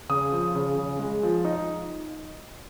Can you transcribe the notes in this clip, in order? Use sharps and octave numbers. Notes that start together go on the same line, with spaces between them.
C#3 D#6
F3
C#3
C#3
G#3
F3
D#4